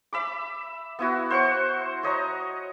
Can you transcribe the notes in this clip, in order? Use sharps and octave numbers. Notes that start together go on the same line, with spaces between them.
E5 B5 D6
B3 E4 F#4
C5 F#5 C#6
C#5 D#5 A#5 C#6